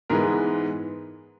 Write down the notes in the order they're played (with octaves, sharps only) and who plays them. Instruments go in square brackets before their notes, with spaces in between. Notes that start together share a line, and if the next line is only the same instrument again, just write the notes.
[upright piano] G#2 E3 G#3 B3 A#4